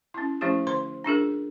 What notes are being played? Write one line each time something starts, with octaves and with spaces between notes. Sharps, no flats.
C#4 E4
F3 A3 C#4 E4 G4
D3 C5 C6
D4 F4 G#4 A#4